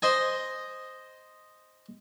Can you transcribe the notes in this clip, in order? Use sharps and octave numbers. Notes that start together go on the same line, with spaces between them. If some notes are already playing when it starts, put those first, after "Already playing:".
C5 D#5 G#5